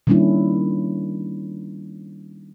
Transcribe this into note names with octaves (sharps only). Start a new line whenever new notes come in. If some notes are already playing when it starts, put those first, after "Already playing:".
D#3 G3 A#3 C#4 D4 E4